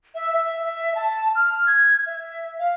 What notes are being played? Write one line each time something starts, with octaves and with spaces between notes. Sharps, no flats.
E5
E5
E5
A5
F6
G#6
E5
F5